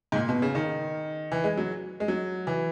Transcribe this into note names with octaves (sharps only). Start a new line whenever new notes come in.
G#2
A#2
B2
C#3
D#3
E3
G#3
F#3
G#3
F#3
E3